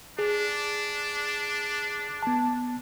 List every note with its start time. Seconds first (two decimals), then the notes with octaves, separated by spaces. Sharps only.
0.19 D4 G#4
2.23 B3 A5